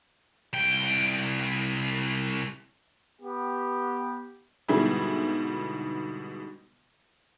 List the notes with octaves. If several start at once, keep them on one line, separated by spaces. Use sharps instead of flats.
C2 G5
B3 G4
G#2 B2 D3 G3 E4 G#4